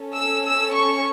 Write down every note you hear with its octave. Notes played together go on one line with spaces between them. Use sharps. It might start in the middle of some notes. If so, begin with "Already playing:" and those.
Already playing: C#4 A4
E6
E6
C#6